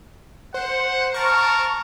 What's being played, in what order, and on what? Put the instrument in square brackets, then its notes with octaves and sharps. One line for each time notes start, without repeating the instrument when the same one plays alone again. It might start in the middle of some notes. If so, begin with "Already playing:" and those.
[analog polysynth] C5 [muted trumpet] F#5
[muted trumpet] A#4 [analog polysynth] A5 C#6